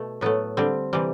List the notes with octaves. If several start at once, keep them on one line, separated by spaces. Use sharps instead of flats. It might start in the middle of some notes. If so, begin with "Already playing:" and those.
Already playing: B2 A3
A2 F#3 A3 B3
D3 G3 C4
C3 E3 G3